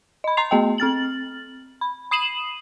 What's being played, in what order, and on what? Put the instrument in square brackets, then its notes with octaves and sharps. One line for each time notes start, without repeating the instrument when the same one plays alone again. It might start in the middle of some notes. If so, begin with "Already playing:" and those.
[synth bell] D#5 B5
A#5 C6 C7 F7
A3 B3 D#5 G5
C4 F6 A6 F#7
B5
B5 D#6 C7 D#7 E7 F#7